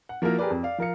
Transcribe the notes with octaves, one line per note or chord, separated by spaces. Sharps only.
F#5
F3 A#3 E4 F#4 A#4
G4 G#4 A#4 B4 D5
F2
D5 F5
F3 A#4 F5 C#7